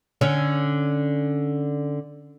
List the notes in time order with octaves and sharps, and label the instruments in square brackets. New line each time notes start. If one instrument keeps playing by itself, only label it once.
[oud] D3 C#4 C#5